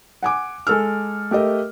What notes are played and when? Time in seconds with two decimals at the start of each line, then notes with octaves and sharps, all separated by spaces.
0.23 F#5 G#5 D6
0.67 G#3 A4 E6 F6
1.31 A3 G4 A#4 D#5